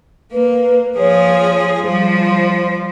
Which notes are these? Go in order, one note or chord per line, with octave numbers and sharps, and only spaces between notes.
A#3 B4
F3 G#4 C#5
F3 G3 C5